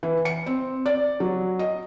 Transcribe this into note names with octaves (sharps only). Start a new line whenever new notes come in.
E3
C#7
C4
D5
F#3
D#5